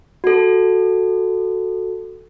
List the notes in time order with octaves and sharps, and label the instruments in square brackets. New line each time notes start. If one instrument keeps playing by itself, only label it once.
[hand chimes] F#4 A4